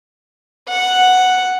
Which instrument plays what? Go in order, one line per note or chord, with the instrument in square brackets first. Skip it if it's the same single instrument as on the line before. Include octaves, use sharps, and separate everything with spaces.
[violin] F#5